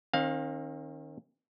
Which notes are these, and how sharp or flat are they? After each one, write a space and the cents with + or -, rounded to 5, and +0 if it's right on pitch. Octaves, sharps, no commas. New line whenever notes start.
D#3 -15 C4 +35 F5 +15